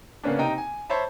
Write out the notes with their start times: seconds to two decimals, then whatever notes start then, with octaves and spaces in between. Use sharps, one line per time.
0.24 C#3 A#3 B3 C#4 D4
0.38 C3 D#4 G5 A#5 D#7
0.58 G#5
0.89 C5 C#5 E5 A5 B5